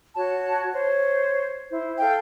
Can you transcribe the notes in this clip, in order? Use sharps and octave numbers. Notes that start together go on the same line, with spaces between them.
F#4 C#5 A5
C5 C#5
E4 C5
A4 F5 G5